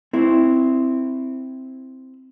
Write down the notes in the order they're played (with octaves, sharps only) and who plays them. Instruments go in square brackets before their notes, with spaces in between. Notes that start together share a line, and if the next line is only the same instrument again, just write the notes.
[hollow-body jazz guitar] C4 E4